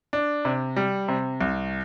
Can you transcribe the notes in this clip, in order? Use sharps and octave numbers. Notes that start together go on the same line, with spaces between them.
D4
C3
G3
C3
C2